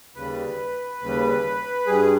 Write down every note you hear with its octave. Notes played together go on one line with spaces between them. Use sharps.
D#2 C#3 G3 B4
D#2 C#3 G3
G2 G3 G#4